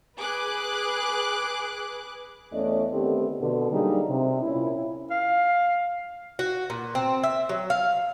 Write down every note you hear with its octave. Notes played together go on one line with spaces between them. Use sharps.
G#4 B4 D6 F#6
E2 A3 C#4 D5 D#5
D3 D#3 A3 B3 C4 G4
B2 D3
F#3 G3 A#3 D4 D#4 G#4
C3
A#2 C#4 E4
F5
F#4
A#2
C4
E5
F#3
F5